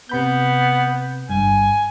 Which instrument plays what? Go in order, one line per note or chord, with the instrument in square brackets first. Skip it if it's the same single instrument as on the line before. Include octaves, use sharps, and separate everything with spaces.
[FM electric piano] C3 B5 G6 [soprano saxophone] B3
[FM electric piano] G1 G2 [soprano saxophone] G#5